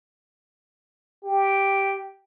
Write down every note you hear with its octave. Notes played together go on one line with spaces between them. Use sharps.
G4